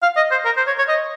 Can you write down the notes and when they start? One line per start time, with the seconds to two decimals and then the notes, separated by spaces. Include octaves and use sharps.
0.02 F5
0.16 D#5
0.31 C5
0.45 A#4
0.57 C5
0.67 C#5
0.78 C#5
0.88 D#5